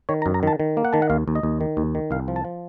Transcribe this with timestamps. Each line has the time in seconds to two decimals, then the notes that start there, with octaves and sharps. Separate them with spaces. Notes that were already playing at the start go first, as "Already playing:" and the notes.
0.09 D#3 C#5
0.22 A#5
0.26 F#2
0.34 A#5
0.43 D#3 A5
0.60 D#3
0.77 A#3
0.85 F#5
0.93 D#3 A5
1.02 F#5
1.10 D#2 F5
1.28 D#2
1.35 D#5
1.43 D#2
1.61 D#3
1.77 D#2
1.95 D#3
2.11 C2 F5
2.28 F3
2.36 A5
2.45 F3